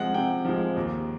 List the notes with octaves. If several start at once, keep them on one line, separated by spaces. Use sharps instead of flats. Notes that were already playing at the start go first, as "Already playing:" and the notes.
Already playing: C3 F3 G#3 F#5
C3 G5
F3 G#3
D#2